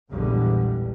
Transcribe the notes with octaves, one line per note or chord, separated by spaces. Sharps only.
A#1 E2 A2 D3 G3 G#3